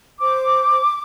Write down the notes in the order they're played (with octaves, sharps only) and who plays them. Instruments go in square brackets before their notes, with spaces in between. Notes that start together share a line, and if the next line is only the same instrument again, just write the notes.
[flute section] C5 D6